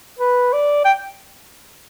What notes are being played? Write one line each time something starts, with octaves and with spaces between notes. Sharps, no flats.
B4
D5
G5